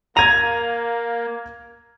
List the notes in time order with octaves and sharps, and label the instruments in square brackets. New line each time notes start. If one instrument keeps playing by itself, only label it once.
[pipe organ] A#3 [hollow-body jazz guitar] A#5 [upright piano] G#6 D#7 F7